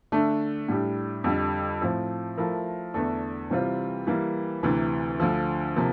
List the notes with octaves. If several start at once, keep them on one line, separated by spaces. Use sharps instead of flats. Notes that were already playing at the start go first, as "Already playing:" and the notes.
D3 A3 D4
A2 G3 D4 G4
F2 D3 G3
A2 F3 C4
F3 A3 E4 A#4
E2 D3 A3 D4 A4
C3 E3 G3 C4 F4
E3 G3 A#3
D2 C3 E3
D2 D3 F3
C3 F3 A#3